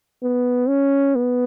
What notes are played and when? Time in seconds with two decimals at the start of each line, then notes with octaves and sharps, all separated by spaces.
0.23 B3
0.68 C#4
1.16 B3